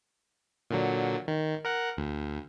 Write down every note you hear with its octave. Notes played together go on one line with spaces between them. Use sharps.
A#2 D3 F#3
D#3
A#4 F#5 F#6
D2